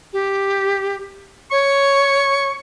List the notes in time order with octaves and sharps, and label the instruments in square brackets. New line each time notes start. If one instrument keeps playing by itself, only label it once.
[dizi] G4
[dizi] C#5 [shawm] C#6